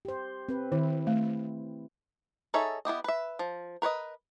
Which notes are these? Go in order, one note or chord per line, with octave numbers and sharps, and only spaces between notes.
G4 C5
C4 B4
D#3 E4
A3
D#4 G#4 A4 C#5 E5
B3 E4 G4 D#5
B4 E5
F3
A#4 B4 C#5 D#5